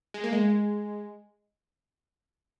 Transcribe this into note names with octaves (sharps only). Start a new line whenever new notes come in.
G#3
A#3
G#3